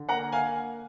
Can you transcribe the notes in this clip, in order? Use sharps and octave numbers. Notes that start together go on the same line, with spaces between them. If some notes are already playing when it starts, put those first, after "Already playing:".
Already playing: D3
A#3 F#5 A#5
A#3 F5 G#5